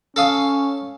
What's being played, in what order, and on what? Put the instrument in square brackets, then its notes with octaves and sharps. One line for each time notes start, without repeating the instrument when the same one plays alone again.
[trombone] C#4 [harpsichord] A4 F5 D#6